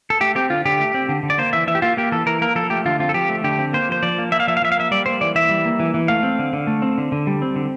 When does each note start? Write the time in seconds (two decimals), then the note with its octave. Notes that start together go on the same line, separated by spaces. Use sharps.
0.10 A4
0.21 A3 G4
0.35 C4 G4
0.50 D3 F4
0.65 D3 G4
0.80 A3
0.94 C4
1.09 D3
1.23 D3
1.30 D5
1.38 A#3 C5
1.53 E3 E5
1.67 E3 E5
1.75 G4
1.82 A#3 F4
1.97 A#3 G4
2.12 E3 A4
2.26 E3 A#4
2.42 A#3 A#4
2.55 F3 A4
2.70 A3 G4
2.85 D3 F4
3.00 C4 F4
3.09 A4
3.14 F3 G4
3.29 A3
3.44 D3 G4
3.58 C4
3.73 A#3 C5
3.89 F3 C5
4.03 F3 D5
4.18 A#3
4.32 A#3 E5
4.40 F5
4.48 F3 E5
4.57 F5
4.62 F3 E5
4.72 F5
4.77 A#3 E5
4.91 G3 D5
5.06 A#3 C5
5.21 E3 D5
5.35 E3 E5
5.49 G3
5.65 A#3
5.80 E3
5.94 E3
6.08 A3 F5
6.23 C4
6.39 D3
6.53 D3
6.67 A3
6.82 C4
6.98 D3
7.12 D3
7.27 G3
7.42 C4
7.56 D3